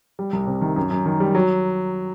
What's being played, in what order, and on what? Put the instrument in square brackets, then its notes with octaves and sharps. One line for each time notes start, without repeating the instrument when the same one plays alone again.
[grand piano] G3
C2
C3
D#3
F#2
F#2
D#3
G3
F#3